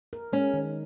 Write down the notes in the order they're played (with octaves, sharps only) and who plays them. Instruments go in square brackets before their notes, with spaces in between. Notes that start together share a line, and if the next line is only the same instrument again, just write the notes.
[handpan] A#4
[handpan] G#3 [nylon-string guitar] C#4
[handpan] D#3